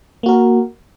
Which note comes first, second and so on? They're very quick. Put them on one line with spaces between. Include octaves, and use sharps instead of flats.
A#3 F#4 A#4